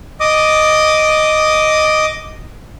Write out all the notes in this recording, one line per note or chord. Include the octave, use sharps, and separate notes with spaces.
D#5 D6 D#6